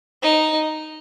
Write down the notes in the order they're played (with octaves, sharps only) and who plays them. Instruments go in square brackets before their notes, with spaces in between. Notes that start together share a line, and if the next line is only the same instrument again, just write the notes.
[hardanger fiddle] D#4